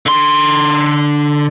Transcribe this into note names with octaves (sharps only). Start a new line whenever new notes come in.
D3 C6